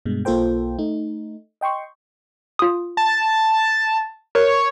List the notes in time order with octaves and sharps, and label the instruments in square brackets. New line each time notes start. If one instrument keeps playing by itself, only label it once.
[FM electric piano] G2 B2 G#3
B1 A#3 F4 A4 C5 G5
A3 D#4
D#5 G5 C6 C#6
[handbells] F4 D#6
[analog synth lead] A5
[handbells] A#4 [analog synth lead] C#5